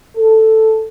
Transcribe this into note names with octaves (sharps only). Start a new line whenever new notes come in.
A4